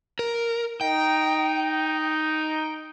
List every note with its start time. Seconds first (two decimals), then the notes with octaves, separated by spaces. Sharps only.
0.19 A#4
0.81 D#4 G5